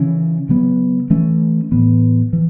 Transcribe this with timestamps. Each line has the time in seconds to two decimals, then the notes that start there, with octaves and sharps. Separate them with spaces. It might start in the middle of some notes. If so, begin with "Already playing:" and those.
Already playing: C#3 E3 C#4
0.49 C#3 F#3 B3
1.10 E3 A3 C#4
1.72 A2 E3 B3
2.33 E3